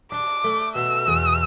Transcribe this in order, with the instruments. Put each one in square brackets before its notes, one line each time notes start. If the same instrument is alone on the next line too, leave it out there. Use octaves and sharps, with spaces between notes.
[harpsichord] D4 [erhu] D6
[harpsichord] A3
[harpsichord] B2 [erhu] E6
[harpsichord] E2